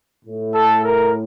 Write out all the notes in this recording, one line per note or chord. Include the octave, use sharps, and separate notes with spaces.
A2
A4
A#4